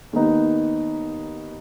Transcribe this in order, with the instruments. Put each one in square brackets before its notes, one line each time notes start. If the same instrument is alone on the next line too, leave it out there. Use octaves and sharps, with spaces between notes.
[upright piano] D#2 D#3 B3 D#4